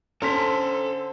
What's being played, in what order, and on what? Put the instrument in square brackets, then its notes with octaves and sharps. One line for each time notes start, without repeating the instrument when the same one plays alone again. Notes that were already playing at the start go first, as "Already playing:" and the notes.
[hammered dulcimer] D3 C5 [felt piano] C#4 B6 [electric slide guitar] A4 A#5